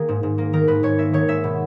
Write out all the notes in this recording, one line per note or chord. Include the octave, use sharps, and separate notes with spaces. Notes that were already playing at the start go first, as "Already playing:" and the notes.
Already playing: D#3 A#3 G#4
G#2
G#2
A#3
D#3 A#4
G#2 B4
G#2 C#5
A#3 E5
D#3 C#5
G#2 E5
B2